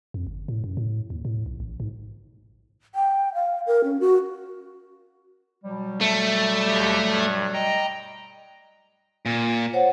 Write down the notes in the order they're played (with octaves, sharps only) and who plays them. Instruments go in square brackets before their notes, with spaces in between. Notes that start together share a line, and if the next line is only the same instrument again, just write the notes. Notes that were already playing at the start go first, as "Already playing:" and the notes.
[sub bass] F2
G1
A2
F#2
A2
D#2
A2
B1
A1
G#2
[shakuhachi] G5
F5
A#4
C#4
F#4
[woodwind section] B2 F#3 G3
[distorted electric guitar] A3
[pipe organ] D#2 G4 G6
G2
D#5 G5 A#5
[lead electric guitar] A#2
[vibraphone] C5 C#5 F#5